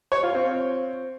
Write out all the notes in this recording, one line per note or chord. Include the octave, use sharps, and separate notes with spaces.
C#5
F4
C4